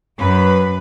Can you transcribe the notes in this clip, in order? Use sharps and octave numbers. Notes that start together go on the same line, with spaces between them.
F#2 B4